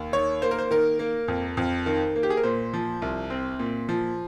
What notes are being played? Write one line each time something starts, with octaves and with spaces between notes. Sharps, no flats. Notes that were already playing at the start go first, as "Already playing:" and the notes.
Already playing: D#2
D#3 C#5
A#3 C5
A#4
C5
D#3 A#4
A#3
F2
F2
D#3
A#3
G4
G#4
A#4
A#2 C5
F3
C2
C4
A#2
F3